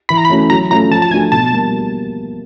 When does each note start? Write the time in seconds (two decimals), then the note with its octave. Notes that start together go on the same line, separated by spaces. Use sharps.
0.09 E3 B5
0.17 A#5
0.25 B5
0.30 A3 C#4 F#4
0.50 F#3 A#5
0.70 A3 C#4 F4 A#5
0.91 F3 A5
1.02 A5
1.11 A3 D4 F#4 G#5
1.32 B2 A5
1.53 G3 A#3